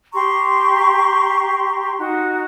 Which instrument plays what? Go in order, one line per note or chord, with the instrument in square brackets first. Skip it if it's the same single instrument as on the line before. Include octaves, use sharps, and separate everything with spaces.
[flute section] G4 A#5 C6 C#6
D#4 F#4